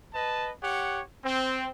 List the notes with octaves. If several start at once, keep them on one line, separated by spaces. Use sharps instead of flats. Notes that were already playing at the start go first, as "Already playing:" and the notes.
B4 D#5 A5
G4 C#5 F#5
C4